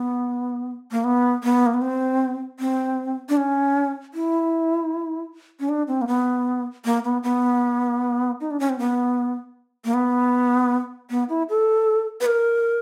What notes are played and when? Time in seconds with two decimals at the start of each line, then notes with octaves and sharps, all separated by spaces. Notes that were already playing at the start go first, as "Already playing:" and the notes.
Already playing: B3
0.91 A#3
1.04 B3
1.44 B3
1.66 A#3
1.74 B3
1.82 C4
2.60 C4
3.29 D4
3.37 C#4
4.14 E4
5.60 C#4
5.69 D4
5.88 C4
6.02 A#3
6.08 B3
6.85 A#3
7.04 B3
7.23 B3
8.41 D#4
8.51 D4
8.60 C#4
8.70 C4
8.79 B3
9.85 A#3
9.94 B3
11.10 B3
11.29 E4
11.49 A4
12.21 B4
12.26 A#4